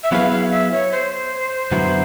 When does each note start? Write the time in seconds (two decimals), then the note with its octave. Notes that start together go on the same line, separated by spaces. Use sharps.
0.03 E5
0.12 F#3 B3 E4 G#4 B4 F5
0.31 F5
0.51 E5
0.72 C#5
0.92 C5
1.72 F#2 D3 F#3 B3 E4